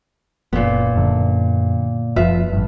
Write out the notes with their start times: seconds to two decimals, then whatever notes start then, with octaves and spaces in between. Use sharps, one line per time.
0.53 F#1 A#2 B3
0.96 F#2 D3
2.16 F#1 F3 F4 B4 E5
2.52 A1 G2